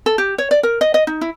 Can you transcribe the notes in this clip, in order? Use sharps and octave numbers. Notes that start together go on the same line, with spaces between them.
A4
G4
C#5
D5
A#4
D#5
D#5
D#4
E4